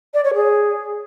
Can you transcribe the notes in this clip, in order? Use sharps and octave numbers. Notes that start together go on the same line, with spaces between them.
D5
C#5
G#4